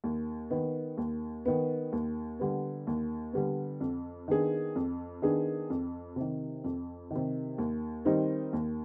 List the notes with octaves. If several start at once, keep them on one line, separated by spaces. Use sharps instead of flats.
D#2
D#3 B3
D#2
D#3 B3
D#2
D3 G3 B3
D#2
D3 G3 B3
F2
D#3 B3 D4 G#4
F2
D#3 B3 D4 G#4
F2
C3 D#3
F2
C3 D#3
D#2
D#3 G3 C4 D#4
D#2